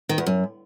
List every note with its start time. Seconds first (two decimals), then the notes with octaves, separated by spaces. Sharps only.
0.09 D#3
0.18 E2
0.26 F#2